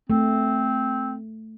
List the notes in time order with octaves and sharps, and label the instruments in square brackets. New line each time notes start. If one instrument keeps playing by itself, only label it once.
[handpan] A3 [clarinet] C4